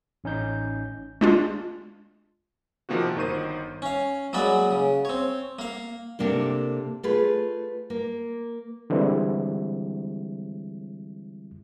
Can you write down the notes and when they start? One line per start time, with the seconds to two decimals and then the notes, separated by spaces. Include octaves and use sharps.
0.24 A1 C#4 D#4 G6
1.21 G#3 D4 F4
2.89 C3 D#3 F3 A#3 C4 F#4
3.16 G1 D#3 D#4 C5 C#6 D#7
3.82 C#4 F5
4.33 F#3 G#3 A#3 D5 B5
4.71 C#3
5.05 C4 C#5
5.59 A#3 F5
6.19 C3 A#3 D4 A4
7.03 A3 F4 G#4 B4
7.90 A#3
8.90 D3 E3 G3 G#3 C4 E4